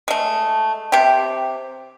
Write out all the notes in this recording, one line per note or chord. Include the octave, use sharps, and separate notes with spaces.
G#3 A3
C3 G4